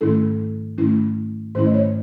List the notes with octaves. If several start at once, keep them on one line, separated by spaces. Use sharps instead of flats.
G#2 D#3 A3 C#4 E4 A4
G#2 D#3 A3 C#4 E4
G#2 D#3 A3 C#4 E4 C5
D#5
C#5